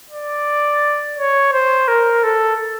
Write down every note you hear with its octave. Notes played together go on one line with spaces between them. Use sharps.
D5
C#5
C5
A#4
A4